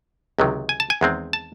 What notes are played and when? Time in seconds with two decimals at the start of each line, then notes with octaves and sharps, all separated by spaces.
0.39 C#2 C3 D#3 F#3
0.69 G#5
0.80 A5
0.90 G#5
1.01 E2 D#3 G#3 C4
1.33 A5